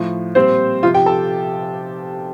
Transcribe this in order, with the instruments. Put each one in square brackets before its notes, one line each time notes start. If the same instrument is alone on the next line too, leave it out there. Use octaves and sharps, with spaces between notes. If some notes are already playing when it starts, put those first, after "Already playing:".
Already playing: [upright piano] A2 F3
A#2 G3 C4 C5
C3 F3 F4 F5
G4 G5
A4 A5